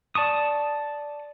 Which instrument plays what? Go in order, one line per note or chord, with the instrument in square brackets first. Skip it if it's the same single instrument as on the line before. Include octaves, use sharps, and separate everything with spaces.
[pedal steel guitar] D5 A5 C#6 D#6